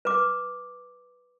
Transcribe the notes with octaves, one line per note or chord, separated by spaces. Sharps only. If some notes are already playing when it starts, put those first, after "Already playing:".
B4 D6